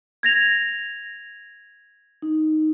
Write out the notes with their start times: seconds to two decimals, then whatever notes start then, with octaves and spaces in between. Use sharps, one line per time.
0.23 G#6 A#6 F7
2.22 D#4